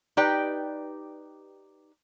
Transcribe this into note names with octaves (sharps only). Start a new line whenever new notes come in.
D#4 G4 B4 D5 G5